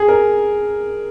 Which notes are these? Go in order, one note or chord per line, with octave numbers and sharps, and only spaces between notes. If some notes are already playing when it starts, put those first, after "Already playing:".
Already playing: G#4
A#4